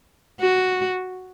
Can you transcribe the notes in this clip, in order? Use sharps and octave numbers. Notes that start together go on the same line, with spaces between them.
F#4